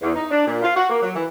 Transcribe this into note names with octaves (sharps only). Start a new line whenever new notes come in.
E2
D#4
D4
A#2
F4
F#4
A#3
F#3
E3